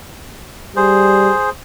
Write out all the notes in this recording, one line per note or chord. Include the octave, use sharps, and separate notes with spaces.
G3 G#4 C5